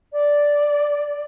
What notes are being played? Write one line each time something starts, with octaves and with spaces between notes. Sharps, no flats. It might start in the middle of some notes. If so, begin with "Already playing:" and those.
D5